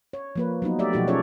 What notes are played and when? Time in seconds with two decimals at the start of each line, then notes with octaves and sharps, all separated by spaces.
0.13 C#5
0.36 F3 A#3 B4
0.62 F#3 B3 D#4
0.79 A3 G4 D5 E5
0.93 B2 F3 F#3 D#4 F#4 G4
1.08 C#4 F4 G#4 A4 C#5 D5